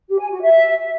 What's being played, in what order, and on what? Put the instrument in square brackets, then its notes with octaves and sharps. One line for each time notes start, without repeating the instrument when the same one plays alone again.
[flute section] G4
G#5
F#4
E5